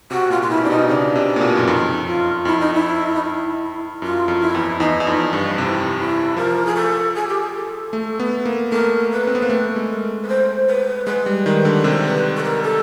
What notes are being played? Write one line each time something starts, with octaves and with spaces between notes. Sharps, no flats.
C3 F#4
A#2 F4
F4
B2 E4
C3 D4
B2 D#4
C#3 D4
C3
A#2
B2
F#2
F2 D#4
F4
F2 E4
D#4
E4
D#4
E4
F#2 F4
F2
E4
E2
E2 D#4
E2
F2
G2
C3 E4
E4
F3 A#4
G#4
A4
G#4
G4
G#4
A4
A3
B3
A#3
A3 A#4
B4
C4
B3
A#3
A3 B4
G#3
A#4
B4
C5
B4
G#3 B4
G3
D#3 B4
D3
C3 A#4
B4
A4
A#4
A4